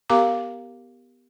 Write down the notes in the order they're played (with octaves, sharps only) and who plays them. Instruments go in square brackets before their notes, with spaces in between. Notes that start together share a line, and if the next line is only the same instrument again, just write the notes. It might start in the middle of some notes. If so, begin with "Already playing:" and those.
[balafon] B3 G4 A#4 F5 A#5 D6